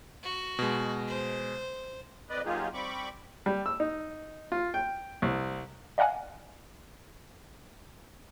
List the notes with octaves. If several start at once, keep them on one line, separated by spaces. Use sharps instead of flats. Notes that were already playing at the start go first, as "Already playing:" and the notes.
F#4
B2 G#3
C5
F2 B4 D5 D#5
F#3 A#3 D#4 F4 G4 G#4
G3 C4 B5 C#6 D6
G3
E6
D#4
F4
G5
C2
D5 D#5 F5 F#5 G#5